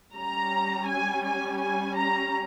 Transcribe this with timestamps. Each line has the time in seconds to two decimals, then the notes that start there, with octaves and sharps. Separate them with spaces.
0.14 G3 C#4 A#5
0.86 G#5
1.23 G#5
1.59 G#5
1.95 A#5